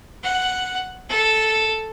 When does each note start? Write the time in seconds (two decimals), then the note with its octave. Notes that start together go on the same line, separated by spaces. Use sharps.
0.23 F#5
1.09 A4